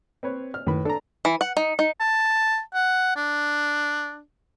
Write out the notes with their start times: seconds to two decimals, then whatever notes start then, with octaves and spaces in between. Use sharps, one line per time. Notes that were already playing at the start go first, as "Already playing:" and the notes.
0.23 C4 B4 C#5
0.54 F6
0.67 F#2 A2 D#3 B4
0.85 D4 A4 A#5
1.25 E3
1.41 F#5
1.57 D#4
1.79 D#4
2.00 A5
2.74 F#5
3.16 D4